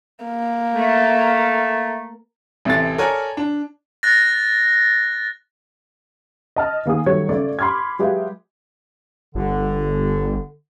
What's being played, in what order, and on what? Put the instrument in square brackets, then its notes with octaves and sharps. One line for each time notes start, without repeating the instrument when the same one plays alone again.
[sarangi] A#3
[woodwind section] A3
[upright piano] A1 C3 E3 A4 A6
A4 A#4 C#5 D5 G#5 A#5
D4
[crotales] F#6 A6 A#6
[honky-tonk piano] D#5 A5 F6
D#3 A#3 G#4 D#6
D#3 F#3 G3 A3 C#5 G#6
C#3 A3 D5
B5 C6 D6 F6 G#6
F#3 G#3 G4 B4 E5 F5
[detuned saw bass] G1 [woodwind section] D3